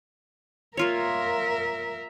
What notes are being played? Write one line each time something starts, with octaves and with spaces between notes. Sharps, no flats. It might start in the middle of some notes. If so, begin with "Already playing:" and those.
A#3 F4 A#4 C#5 E5